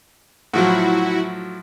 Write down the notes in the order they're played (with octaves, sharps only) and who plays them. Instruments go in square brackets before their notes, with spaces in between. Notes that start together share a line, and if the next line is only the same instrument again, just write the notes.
[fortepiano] A2 F3 F#3 [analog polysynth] E4 F#4